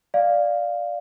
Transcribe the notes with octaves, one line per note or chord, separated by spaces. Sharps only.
D5 F5